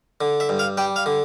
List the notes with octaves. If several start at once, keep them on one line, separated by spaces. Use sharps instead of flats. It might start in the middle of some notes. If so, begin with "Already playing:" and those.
D3
E5
G2
F5
G3 G5
F5
D3